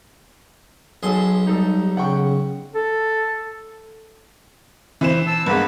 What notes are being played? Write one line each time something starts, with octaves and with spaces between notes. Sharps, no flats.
B1 G#4 A4 C6
G3 D#4 A4
C#3 F#5 G5 C#6
A4
E3 C4 E7
A5 E6
G2 G#3 A#3 B3 B4